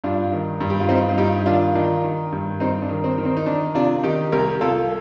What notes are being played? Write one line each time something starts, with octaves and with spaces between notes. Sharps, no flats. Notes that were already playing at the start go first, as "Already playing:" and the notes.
G2 D4 F4
D#3
G2
G4
F4
G2 C4 D#4
F4
G2 D#4 G4
D#3 D4 F4
D#3 D4 F4
D#3
G2
G2 C4 D#4
D4
D#3
C4
D#3
C4
D#4
D#3 D4
C3 D4 F4
D#3 D#4 G4
C2 G4 A#4
C2 F4 A4